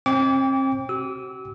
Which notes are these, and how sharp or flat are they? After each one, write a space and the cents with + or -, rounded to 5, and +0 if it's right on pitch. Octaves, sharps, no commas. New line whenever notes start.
C4 +40 G5 +25 D6 -30
F#4 +40 E6 -25